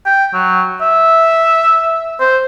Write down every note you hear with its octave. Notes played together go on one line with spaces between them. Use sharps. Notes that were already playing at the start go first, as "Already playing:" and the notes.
G5
F#3
E5
C5